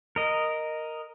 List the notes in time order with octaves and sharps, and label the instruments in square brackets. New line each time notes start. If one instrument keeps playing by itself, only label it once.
[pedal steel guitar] A#4 D#5